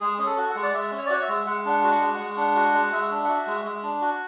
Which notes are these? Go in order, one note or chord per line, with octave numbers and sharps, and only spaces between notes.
G#3 G#4
C#4 G#4
A4
F#4
F#5
G#3
D5
G#3 E5
C#4
C#5
D5
F#4 C#5
E5
G#3
G#3 F#5
D4 F#5
F#4
F#5
G#3
G#3 F#5
D4 F#5
F#4
G#3
G#3 E5
D4
F#5
F#4 E5
G#3
G#3
D4
F#4